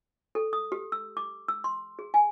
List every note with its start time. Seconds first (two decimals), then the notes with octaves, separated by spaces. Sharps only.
0.35 A4
0.53 D#6
0.72 G4
0.92 E6
1.17 D6
1.48 E6
1.64 C6
1.99 G#4
2.14 G#5